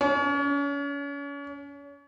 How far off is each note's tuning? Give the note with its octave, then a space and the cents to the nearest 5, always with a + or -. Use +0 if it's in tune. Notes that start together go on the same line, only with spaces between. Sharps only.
C#4 +35